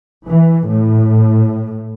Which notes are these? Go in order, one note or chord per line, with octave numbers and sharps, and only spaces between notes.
E3
A2